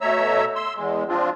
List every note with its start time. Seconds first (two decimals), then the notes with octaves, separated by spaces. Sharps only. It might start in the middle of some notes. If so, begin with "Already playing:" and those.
0.01 B2 A3 C#5 E5 A#5 E6
0.55 C6 E6
0.76 E2 G#3
1.09 F3 C4 D4 F4